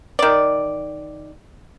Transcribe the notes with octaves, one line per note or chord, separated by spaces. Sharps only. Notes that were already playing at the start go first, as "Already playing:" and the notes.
D#3 D5